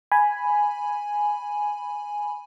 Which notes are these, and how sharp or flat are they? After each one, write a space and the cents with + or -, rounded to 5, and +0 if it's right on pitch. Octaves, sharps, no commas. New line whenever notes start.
G#5 +0 B5 +0